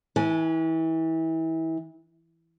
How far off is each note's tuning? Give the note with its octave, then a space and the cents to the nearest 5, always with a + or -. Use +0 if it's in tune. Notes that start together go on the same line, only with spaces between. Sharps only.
E3 -30 G#5 +15